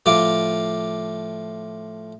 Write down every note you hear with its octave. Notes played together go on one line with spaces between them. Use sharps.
A2 F3 F4 D6